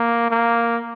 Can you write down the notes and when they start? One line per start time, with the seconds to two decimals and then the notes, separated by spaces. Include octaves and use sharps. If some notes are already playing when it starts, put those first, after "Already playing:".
Already playing: A#3
0.31 A#3